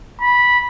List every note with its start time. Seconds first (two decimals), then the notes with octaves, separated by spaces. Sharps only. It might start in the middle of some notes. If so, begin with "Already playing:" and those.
0.21 B5